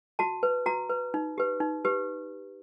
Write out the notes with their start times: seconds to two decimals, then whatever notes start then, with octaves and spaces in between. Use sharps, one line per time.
0.19 F#4 A5
0.43 B4
0.66 F#4 A#5
0.90 B4
1.14 D#4
1.38 G4 B4
1.60 D#4
1.85 G4 B4